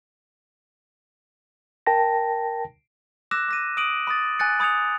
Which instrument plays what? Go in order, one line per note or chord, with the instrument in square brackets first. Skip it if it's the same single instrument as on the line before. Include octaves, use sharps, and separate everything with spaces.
[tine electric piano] A#4 G5 A5 A#6
[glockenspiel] D6 E6 F#6 A#6 E7
D6 A#6 D#7
D#6 D7 D#7 F#7
B5 D#6 A6
G#5 F#6 A6 C#7
B5 D#6 G#6 C#7 F7